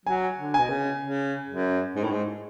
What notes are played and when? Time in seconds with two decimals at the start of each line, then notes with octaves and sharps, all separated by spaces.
0.06 F#3 G#5
0.38 D3
0.54 B2 G#5
0.70 C#3
1.01 C#3
1.49 F#2
1.96 G#2
2.04 A2
2.12 G#2